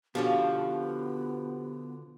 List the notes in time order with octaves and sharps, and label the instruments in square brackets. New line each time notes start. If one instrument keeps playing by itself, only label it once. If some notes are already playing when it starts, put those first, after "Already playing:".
[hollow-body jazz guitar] B2 D3 C#4 [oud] F3 [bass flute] B3 [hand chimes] G4